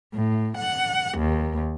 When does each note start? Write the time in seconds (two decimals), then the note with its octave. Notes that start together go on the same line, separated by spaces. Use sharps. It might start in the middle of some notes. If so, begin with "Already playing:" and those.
0.15 A2
0.57 F#5
1.17 D#2